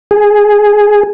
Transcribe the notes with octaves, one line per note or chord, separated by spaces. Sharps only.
G#4